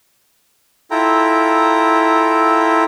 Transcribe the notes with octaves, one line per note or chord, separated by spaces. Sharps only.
E4 F4 A4 G5 A#5